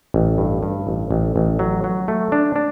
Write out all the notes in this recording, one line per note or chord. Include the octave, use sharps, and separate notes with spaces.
A1
G2
G2
A1
A1
A1
F#3
F#3
A3
D4
D4